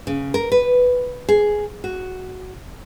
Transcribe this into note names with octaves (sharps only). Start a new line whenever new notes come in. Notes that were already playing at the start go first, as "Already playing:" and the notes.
C#3
A#4
B4
G#4
F#4